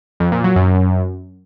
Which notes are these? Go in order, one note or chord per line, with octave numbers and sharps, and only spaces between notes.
F2
A#2
F#3
F#2